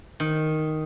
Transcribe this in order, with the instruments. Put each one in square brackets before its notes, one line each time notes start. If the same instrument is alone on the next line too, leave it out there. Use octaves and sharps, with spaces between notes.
[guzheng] D#3